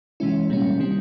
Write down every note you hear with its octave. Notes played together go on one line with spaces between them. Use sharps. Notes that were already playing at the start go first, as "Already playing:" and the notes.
C3 E3 G#3 C#4 E4
A#2 G3 A#3 C#4
C3 D#3 G3 C4